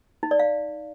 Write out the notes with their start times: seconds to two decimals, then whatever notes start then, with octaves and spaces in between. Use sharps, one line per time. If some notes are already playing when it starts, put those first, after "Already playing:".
0.23 D#4
0.31 D5
0.39 F5